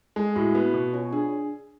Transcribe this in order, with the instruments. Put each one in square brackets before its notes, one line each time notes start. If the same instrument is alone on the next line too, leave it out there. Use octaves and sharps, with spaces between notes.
[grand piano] G#3 [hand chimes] A4
[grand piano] A2 [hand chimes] F#4
[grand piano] B3 [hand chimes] F#4
[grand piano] B2
[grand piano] C#4 [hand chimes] F4
[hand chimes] D4 [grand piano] G#4